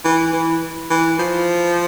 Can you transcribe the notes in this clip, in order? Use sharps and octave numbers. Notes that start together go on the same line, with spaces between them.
E3
E3
E3
F3